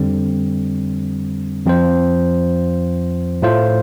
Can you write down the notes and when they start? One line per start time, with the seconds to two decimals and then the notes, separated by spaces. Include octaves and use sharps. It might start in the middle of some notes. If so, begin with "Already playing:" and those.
Already playing: F2 D3 G3 C4
1.65 F2 F3 C4 F4 C5
3.42 A2 A3 F4 C5